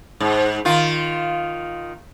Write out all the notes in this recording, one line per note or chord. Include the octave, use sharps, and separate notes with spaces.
G#2
D#3 F4